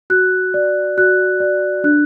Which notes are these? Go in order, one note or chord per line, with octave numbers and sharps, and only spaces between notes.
F#4 F#6
D5
F#4 F#6
D5
D4 F#6